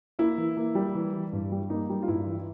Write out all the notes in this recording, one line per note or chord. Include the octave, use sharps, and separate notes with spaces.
A#3 E4
E3
A#3
G3
E3
E3
G2
G3
A#3 D#4
G3
F4
G2 E4
E3